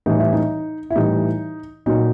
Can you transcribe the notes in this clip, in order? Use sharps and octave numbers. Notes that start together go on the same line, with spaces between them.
A2 E3 G3 D#4
E4
D#4
E4
A2 E3 G3 D#4
A#2 F#3 D#4